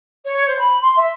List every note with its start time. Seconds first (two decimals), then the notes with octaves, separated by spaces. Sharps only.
0.24 C#5
0.46 C5
0.58 B5
0.81 C6
0.96 E5